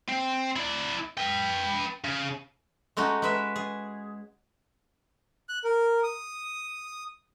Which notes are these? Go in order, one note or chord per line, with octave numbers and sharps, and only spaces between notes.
C4
E4 D5
B4 G5
C#3
G#3 A3 C#4 D#4 F#4
G#3 B4 E5
G#4
F#6
A#4
D#6